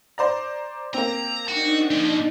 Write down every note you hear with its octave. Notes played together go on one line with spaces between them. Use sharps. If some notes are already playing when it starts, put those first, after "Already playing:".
C5 D5 A#5
A#3 C4 A#5
D4 D#4 F#4
A#2 F3